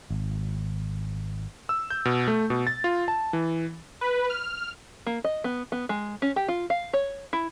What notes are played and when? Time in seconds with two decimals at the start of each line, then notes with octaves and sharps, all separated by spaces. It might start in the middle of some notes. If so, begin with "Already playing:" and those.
0.11 G#1
1.69 E6
1.90 G6
2.05 B2
2.28 A3
2.50 B2
2.67 A6
2.84 F4
3.08 A5
3.33 E3
4.01 B4
4.30 F6
5.06 A#3
5.24 D#5
5.44 B3
5.72 B3
5.89 G#3
6.22 C#4
6.36 G4
6.48 F4
6.70 F5
6.93 C#5
7.33 E4